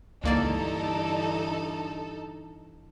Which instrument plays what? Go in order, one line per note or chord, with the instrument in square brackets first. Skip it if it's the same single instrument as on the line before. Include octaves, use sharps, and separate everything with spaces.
[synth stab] C#2 A#3 D5 [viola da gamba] G2 D3 E3 [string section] D#4 A4